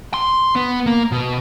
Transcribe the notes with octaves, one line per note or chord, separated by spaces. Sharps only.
C6
B3
A#3
B2